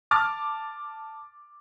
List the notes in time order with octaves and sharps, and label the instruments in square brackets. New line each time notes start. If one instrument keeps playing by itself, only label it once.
[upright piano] A5 D6 F6 A6